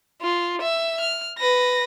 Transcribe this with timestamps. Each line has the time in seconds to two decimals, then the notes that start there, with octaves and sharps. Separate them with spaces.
0.22 F4
0.61 E5 E6
1.00 F6
1.38 B4 A#6